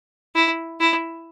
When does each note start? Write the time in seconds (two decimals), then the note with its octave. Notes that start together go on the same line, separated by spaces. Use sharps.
0.35 E4
0.80 E4